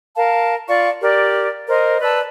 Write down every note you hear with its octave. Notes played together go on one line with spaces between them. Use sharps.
A#4 F5 A5
F4 D5 F5 C#6
G4 A#4 D5
A#4 C5 D#5
B4 D5 A5 E6